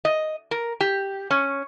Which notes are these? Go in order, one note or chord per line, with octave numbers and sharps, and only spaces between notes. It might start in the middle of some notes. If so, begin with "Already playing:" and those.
D#5
A#4
G4
C#4